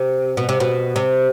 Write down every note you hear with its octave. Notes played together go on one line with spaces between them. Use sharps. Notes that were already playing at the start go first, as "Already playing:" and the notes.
Already playing: C3
B2
C3
B2
C3